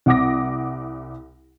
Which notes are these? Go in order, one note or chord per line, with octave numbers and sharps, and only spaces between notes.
C2 F#5 D6 D#6 A#6